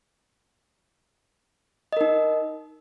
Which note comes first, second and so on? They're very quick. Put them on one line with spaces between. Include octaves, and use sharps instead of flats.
D#5 A#4 D#4